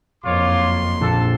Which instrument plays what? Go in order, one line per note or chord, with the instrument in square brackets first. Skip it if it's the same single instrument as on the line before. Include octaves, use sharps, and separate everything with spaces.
[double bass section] F#1 F2 A#3 [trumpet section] F4 C#5 D6 [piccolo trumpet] C6
[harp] A#1 A5 [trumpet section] A4